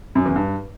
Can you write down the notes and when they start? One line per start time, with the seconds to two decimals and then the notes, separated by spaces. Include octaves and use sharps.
0.15 F#2
0.26 E2
0.36 G2